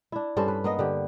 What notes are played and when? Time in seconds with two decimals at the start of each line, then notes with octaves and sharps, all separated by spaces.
0.12 D4 E4
0.37 G2 C#4 A4 C5
0.48 B4
0.64 A#3 B3 D#5
0.79 D3 G4